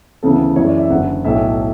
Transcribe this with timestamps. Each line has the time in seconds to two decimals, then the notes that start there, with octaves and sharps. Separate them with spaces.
0.23 D2 C#3 E3 B3 A4
0.56 F#2 E3 G#3 C#5
0.67 D5
0.79 E5
0.90 F#1 F#2 D3 F#5
1.24 B1 A2 F#3 A3 E5